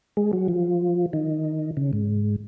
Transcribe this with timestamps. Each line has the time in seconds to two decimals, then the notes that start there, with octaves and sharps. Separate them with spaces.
0.17 G#3
0.33 F#3
0.48 F3
1.13 D#3
1.77 C#3
1.93 G#2